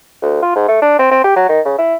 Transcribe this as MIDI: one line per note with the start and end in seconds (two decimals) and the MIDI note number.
0.22 0.41 38
0.42 0.52 65
0.56 0.65 44
0.68 0.78 57
0.82 0.95 62
0.99 1.09 60
1.11 1.21 60
1.24 1.34 67
1.36 1.49 54
1.49 1.60 51
1.65 1.76 49
1.78 1.96 64